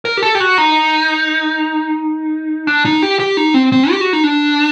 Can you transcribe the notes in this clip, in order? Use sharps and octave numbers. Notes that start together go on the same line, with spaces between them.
A#4
G4
A4
G4
F#4
D#4
D4
D#4
G4
G4
D#4
C4
C4
G4
F#4
D#4
D4